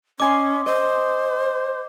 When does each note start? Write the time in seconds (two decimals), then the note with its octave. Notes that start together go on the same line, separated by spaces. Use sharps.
0.20 C#4 D#5 G#5 C6 D6
0.66 C5 D#5